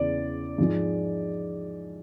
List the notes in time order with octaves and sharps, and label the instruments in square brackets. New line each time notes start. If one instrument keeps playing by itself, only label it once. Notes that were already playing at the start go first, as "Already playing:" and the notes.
Already playing: [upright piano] E2 C#3 E3 [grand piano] D5
[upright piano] G#2 F3 G#3